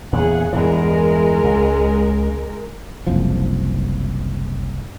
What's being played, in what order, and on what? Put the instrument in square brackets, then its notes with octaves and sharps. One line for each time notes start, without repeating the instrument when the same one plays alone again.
[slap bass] E2 A#2 C#3 [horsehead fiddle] G#4 F#5
[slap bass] E2 G2 E3 [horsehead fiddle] G#3 A#4
[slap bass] C#2
[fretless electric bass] F#1 C2 F3